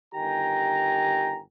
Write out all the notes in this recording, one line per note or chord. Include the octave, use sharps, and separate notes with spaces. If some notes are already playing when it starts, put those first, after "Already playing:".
G1 D#3 G4 G5 G#5 A#5